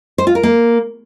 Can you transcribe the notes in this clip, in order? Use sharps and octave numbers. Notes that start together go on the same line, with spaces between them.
C5
F4
A#4
A#3